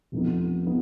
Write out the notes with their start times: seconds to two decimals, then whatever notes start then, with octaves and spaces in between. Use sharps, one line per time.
0.12 F1 F2 F3 B3 D#4
0.66 F3 B3 D#4